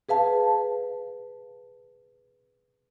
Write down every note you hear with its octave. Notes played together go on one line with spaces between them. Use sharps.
G#4 B4 F5 A5